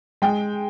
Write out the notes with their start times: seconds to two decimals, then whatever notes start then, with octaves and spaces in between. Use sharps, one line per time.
0.22 G#3 G5